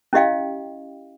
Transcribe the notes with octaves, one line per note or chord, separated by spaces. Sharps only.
C#4 E4 G4 D#5 F5 G5